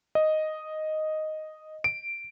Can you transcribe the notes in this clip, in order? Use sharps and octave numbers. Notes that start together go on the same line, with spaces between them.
D#5
D7